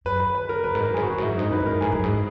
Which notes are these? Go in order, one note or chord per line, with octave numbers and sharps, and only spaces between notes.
F#2 B4
B4
B4
A#4
F#2 B4
G#2
F#2 A#4
G#2 G#4
F#2 F#4
G#2 E4
F#2
G#2 D#4
F#2 B4
G#2
F#2 A#4
G#2 G#4
F#2
G#2